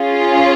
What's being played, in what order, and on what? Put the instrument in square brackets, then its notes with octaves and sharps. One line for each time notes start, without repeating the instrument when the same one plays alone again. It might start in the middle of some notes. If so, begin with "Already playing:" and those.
Already playing: [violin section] C#4 F4 G#4